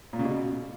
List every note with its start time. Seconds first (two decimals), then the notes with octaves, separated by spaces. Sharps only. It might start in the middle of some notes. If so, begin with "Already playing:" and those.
0.13 A#2
0.19 C#3
0.25 B2